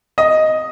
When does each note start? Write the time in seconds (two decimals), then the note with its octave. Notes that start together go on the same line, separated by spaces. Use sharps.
0.18 D#5